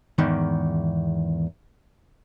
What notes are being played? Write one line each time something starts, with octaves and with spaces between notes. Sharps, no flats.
E2 G#2 D#3